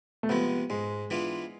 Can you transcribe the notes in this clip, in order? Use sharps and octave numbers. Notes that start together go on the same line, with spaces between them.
A3
C3 F3 G#3 B3
G#2 G#3
E3 B3 D4 F4